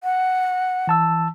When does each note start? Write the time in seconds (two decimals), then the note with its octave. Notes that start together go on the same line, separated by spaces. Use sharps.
0.04 F#5
0.87 E3 A5 E6